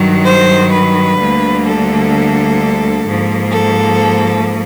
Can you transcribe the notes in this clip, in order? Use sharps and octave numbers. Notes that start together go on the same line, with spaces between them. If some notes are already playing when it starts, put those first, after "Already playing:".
Already playing: G2 D#3 F#3
C5
B4
D2 D3 G3 A#3
A4
G#2 F3 A#3
A4